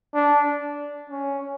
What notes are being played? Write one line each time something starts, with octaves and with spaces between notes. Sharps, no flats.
D4
C#4